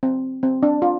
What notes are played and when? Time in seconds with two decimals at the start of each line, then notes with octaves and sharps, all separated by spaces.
0.03 C4
0.43 C4
0.63 D4
0.82 F4